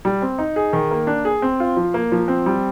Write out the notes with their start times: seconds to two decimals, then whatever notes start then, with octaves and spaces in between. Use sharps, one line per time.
0.05 G3
0.22 C4
0.38 D#4
0.56 G#4
0.73 D#3
0.91 A#3
1.07 D4
1.25 G#4
1.42 C4
1.60 F4
1.76 F3
1.94 A#3
2.12 F3
2.28 C4
2.46 G3